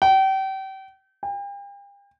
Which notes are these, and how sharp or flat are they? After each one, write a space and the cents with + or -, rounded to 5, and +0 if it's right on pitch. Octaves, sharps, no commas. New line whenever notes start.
G5 -35
G5 +40